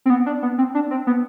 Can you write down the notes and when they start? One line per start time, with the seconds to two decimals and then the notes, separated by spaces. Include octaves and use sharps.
0.06 C4
0.10 B3
0.26 D4
0.43 B3
0.58 C4
0.75 D4
0.91 C4
1.07 B3